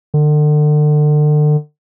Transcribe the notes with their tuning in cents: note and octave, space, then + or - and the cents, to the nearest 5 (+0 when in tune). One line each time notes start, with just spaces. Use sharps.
D3 +35